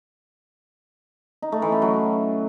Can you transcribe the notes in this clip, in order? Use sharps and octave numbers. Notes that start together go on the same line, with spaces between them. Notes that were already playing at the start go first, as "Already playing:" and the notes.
D#4
A3
E3
C#4
F#3